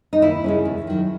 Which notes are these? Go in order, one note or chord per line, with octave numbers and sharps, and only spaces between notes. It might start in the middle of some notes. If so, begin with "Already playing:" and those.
D#4
D#2 E4
C#3 G#3 C#4
E2
D#3 F#3